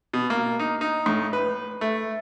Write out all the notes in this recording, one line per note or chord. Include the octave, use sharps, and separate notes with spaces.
B2
A#3
D#4
D#4
A2
B4
A3